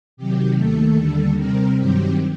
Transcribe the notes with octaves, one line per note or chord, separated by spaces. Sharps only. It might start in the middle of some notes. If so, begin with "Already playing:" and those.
C3 D#3 F#3 G4
D#2 D#3 A3 A4
D#2 D3 G3
C3 G3 C4 A#4
G2 D#3 F#3 C4 G4